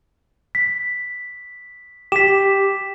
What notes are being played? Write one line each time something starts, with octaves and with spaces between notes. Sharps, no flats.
B6
G4 B6 E7